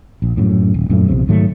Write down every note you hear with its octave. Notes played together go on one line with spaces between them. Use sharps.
A#1
F#2 A2
D#1
F#2 A#2 D3 A3
A#1 E2 C3
G#2 D#3 F#3 A3